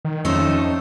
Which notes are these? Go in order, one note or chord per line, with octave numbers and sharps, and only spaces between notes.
D#3
F2 A3 C#4 D#4 C5